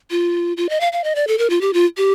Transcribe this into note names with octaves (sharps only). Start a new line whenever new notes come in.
F4
F4
D#5
F5
F5
D#5
D5
A4
A#4
F4
G4
F4
G4